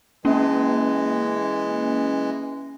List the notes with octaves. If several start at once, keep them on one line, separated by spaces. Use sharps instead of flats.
E3 G#3 A#3 C#4